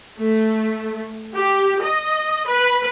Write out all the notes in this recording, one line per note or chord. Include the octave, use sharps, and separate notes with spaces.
A3
G4
D#5
B4